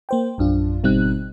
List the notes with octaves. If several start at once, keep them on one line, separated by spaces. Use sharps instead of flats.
A#3 C5 G5
A#1 F#2 D4 F4
G#1 B2 G3 C4 D#4 F#6